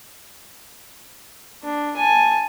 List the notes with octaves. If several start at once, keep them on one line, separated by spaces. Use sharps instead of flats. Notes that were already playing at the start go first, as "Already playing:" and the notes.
D4
G#5 A5